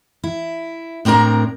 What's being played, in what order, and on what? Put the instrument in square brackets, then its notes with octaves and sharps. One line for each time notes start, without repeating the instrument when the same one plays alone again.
[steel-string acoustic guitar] E4
A2 C4 D4 A#4 A#5